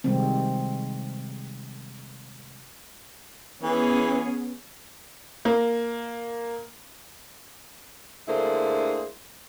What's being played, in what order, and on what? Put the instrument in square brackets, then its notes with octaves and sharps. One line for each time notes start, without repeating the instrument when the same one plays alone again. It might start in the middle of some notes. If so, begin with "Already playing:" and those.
[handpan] C3 D#3 G3 G#3 C4
[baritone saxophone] E3 [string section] B3 C#4 G#4
[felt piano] A#3
[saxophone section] D2 D3 A#3 E4 G#4 C5